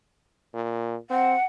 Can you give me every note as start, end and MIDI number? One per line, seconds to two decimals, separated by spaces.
0.54 0.96 46
1.10 1.35 60
1.10 1.43 78